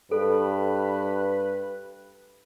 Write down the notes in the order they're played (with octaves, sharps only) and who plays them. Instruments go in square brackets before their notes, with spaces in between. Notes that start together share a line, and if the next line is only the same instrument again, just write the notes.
[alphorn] G2 [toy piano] A4 [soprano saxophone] B4